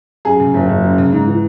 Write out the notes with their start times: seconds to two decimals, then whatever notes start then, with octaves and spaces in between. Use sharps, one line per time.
0.25 F#2 G#4
0.40 C#3
0.54 F#1
0.69 F#1
0.84 F#2
0.98 C#3
1.12 G#2
1.27 E3